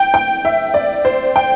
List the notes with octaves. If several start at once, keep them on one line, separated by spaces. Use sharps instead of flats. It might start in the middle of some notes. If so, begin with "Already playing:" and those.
Already playing: G5
G5
E5
D5
C5
G5